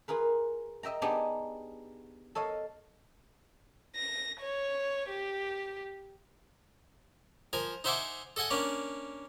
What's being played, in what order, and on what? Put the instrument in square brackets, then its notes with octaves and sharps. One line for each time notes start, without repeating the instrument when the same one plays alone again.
[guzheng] F4 G#4 A#4 B4
D#5 E5 G5 A#5
B3 D4 D#4 G4 G#4
A4 C#5 D#5 F5
[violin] A#6
C#5
G4
[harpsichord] F3 A#4 G#5
D#4 C5 E5 F#5 G#5 D6
A4 D#5 F#5 G#5
A#3 C#4 D4